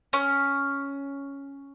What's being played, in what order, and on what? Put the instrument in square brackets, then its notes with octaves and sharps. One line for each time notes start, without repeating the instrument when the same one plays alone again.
[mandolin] C#4